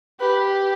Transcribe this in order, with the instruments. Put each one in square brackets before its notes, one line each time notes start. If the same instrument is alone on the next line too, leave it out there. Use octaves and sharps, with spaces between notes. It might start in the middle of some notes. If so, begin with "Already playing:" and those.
[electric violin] G4 [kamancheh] B4